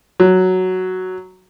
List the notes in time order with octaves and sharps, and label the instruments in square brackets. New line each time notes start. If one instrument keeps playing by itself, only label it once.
[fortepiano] F#3